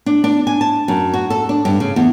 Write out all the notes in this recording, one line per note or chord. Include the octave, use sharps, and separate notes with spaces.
D4
D4
G#5
A5
F#2
F#4
A4
D4
G2
C#3
E2